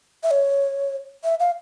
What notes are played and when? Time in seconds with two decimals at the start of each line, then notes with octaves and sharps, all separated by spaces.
0.23 E5
0.31 C#5
1.24 E5
1.40 F5